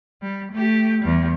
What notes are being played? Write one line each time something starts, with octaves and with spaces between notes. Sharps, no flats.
G3
A3 G4
E2 G3